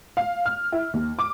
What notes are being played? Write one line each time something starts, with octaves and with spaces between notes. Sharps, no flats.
F5
F6
E4
D#2
D6